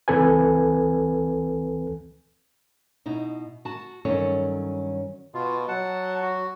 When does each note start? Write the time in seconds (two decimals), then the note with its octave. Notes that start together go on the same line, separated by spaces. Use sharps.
0.08 C#2 E3 C4 A4 B4 G#5
3.06 B2 D#4 E4
3.65 F#4 A5
4.05 G2 D#3 F#3 C#4 A4 C#5
5.34 B2 F4
5.68 F#3 F#5 A5
6.22 F#4